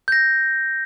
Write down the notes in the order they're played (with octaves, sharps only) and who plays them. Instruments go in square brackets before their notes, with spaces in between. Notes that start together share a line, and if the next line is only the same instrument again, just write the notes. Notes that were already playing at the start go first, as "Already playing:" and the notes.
[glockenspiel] G6 A#6